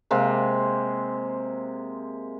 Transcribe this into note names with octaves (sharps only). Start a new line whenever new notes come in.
C3 G#3 A#3